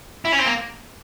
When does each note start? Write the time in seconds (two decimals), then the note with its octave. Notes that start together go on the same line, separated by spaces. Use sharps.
0.25 E4
0.32 C#4
0.39 C4
0.46 A#3